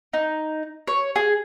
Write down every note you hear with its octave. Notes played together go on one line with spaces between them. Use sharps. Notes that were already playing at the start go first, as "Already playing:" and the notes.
D#4
C#5
G#4